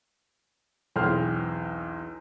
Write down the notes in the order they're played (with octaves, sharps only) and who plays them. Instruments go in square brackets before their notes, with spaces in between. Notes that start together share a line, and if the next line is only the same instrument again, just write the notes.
[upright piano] B1 E2 C4 G#4 C5 F6